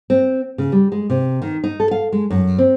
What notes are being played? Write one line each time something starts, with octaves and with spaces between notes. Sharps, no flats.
C4
C#3
G3
G#3
C3
D#3
D#4
A4
F5
G#3
F#2
C4